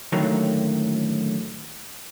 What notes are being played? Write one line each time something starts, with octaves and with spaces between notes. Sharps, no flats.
F#2 A2 D3 D#3 F#3 A#3